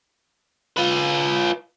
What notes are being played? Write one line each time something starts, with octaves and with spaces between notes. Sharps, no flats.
F4 B4